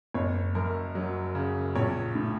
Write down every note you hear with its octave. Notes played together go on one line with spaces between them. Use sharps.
F#1 C#5
F#2 A#4
F#3
C#3
A#1 C#5
A2